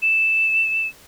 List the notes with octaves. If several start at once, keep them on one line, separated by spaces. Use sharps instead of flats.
E7